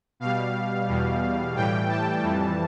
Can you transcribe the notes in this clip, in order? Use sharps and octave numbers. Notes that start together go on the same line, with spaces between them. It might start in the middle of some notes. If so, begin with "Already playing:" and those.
B2 G3 F5
E2 B2 G3
A2 E3 G3 G5
A5
F2 E3 G3